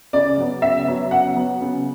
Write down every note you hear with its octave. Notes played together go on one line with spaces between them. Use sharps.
C#3 D5
F#3 B3
C#3 E5
F#3 B3
C#3 F#5
F#3 B3
C#3